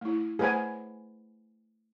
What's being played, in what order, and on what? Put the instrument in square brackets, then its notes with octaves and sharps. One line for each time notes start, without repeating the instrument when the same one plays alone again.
[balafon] A3 E4
[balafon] A3 C5 F#5 [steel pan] G#4 B4 G#5